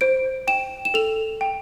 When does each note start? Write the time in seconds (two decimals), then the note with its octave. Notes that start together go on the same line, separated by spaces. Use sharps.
0.01 C5 D7
0.47 G5 E7
0.85 E7
0.94 A4 F7
1.41 G5